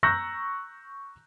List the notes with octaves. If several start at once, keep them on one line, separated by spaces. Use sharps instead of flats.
A#5 C#6 E6 F#6 G6 A#6